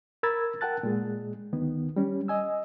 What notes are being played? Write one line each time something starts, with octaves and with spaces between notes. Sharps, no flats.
A#4 A#5 B5 E6 G#6 A6
A#4 F#5 G5 A5 F#6 A6
A#2 G#3 G#4
D2 D#3 B3
G3 C#4
D#5 G#5 E6